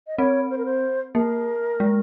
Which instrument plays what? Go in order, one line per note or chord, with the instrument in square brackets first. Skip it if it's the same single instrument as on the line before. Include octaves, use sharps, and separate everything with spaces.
[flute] D#5
[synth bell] C4 [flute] C#5
[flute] C5
A#4
C5
[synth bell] A#3 [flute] A#4
[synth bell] G#3